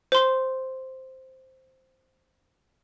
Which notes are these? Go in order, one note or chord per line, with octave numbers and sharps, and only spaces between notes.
C5 C6